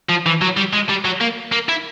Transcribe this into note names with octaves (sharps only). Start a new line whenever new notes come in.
F3
E3
F#3
G3
G#3
G3
F#3
A#3
A#3
E4